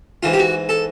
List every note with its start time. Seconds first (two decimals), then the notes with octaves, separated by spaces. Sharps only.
0.23 G#2 E3 F4
0.33 G4
0.39 F#4
0.69 A4